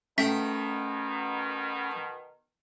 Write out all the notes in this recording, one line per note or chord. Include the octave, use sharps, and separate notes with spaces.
B2 D#3 A3 C#4 G5 B6